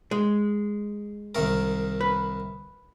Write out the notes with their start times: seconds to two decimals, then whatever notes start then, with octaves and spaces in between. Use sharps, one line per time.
0.11 G#3
1.35 C2 D#3 A#4
2.01 B4